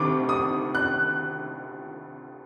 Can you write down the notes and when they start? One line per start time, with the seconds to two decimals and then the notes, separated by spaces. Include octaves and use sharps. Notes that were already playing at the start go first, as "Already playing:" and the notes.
Already playing: D2 C3 D#3 D6
0.29 D#6
0.75 F#6